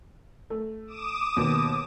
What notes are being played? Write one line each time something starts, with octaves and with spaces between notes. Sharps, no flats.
A3
D6 D#6 E7
D#2 B2 D#3